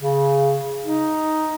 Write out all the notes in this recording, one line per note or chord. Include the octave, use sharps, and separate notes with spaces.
C#3
D#4